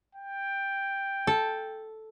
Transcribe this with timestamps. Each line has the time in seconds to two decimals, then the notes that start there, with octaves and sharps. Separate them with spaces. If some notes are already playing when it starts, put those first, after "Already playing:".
0.15 G5
1.27 A4